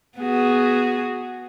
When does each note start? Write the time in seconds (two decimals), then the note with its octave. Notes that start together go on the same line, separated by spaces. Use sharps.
0.18 B3 F#4 G#4